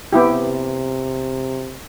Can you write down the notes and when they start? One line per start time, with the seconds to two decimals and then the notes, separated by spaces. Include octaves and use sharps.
0.13 C3 B3 E4 G4